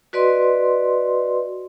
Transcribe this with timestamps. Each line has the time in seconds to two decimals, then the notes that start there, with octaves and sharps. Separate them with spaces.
0.13 F#4 B4 D5 D#5 C6